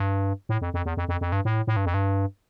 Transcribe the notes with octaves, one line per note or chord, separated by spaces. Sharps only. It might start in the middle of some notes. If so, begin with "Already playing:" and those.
Already playing: G2
A2
F2
F2
E2
F2
F2
F2
G2
A2
A2
G2
F2
G2